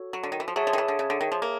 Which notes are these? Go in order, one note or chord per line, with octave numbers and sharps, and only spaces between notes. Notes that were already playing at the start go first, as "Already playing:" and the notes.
Already playing: F#4 A4 C#5
F#3
D3
D#3
E3
F3
F#3 G#4 C#5 E5 A5
F3
D#3
E3
D3
C#3
D3
D#3
F3
A#3